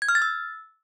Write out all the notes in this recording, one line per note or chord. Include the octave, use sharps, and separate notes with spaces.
G#6
F6
A6
E6